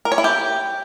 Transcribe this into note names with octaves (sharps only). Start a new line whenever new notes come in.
A#4
C#5
E4
G4